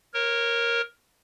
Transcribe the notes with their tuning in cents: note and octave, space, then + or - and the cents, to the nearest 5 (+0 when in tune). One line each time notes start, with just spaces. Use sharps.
A#4 +5 C#5 -20